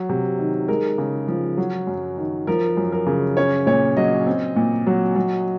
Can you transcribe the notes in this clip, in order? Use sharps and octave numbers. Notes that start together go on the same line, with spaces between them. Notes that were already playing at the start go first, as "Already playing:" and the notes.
Already playing: F#3
C3
D#3
G#3 A#4
C#3
F3
F#3
F#2
D#3
F3 A#4
F#2
A#4
C#3
C#4 C#5
A#2 C#5
F#3 D#5
C4
A#2
F#3
F#3